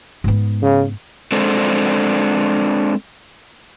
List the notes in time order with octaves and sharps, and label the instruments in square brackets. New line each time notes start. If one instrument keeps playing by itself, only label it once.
[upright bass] G#2 B3
[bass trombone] C#3
[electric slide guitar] G#3 C4 D4 A4 C5